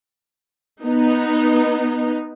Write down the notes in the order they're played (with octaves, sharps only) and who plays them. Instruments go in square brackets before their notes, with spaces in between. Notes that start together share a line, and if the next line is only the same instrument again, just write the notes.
[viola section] B3 D#4